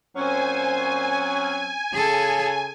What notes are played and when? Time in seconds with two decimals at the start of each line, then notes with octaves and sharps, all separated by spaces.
0.16 A#2 F#3 C4 C#4 C5 G#5
1.93 C#3 G#4 A4